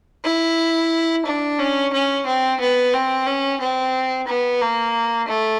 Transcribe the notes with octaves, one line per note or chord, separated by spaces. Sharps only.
E4
D4
C#4
C#4
C4
B3
C4
C#4
C4
B3
A#3
A3